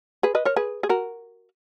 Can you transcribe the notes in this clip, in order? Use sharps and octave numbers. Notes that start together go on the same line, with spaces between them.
G#4 B4
B4 D#5
A#4 C#5
G#4 B4
G#4
F#4 A#4